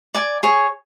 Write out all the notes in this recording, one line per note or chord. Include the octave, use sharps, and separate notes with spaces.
D5 G#5 D6
G#4 C#5 G#5 C#6